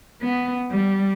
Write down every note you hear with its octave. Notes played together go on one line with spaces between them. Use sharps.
B3
G3